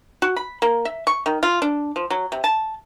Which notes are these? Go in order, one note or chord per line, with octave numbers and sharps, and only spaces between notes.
F#4
B5
A#3
E5
C#6
D#3
F4
D4
F3
F#3
C3
A5